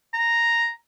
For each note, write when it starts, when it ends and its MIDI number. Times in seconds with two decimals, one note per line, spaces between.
0.13 0.70 82